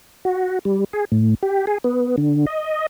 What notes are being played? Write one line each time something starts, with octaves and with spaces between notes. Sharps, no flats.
F#4
G3
G#4
A2
G4
G#4
B3
D3
D#5